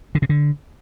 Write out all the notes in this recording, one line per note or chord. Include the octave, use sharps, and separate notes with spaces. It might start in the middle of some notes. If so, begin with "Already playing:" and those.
D3
C3
D3